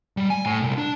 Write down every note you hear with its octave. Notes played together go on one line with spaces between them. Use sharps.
G3
G#5
A2
C2
D4